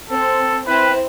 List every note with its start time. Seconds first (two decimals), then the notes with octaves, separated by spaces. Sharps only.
0.09 C4 A4
0.67 C4 E4 B4